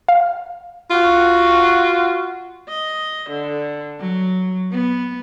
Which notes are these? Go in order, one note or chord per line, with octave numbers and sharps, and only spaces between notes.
F5
F4 F#4
D#5
D3
F#3
B3